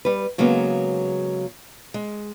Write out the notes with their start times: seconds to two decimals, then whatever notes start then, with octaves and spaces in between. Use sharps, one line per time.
0.05 G3 B4
0.38 C#3 F#3 G#3 A#3 B3
1.94 G#3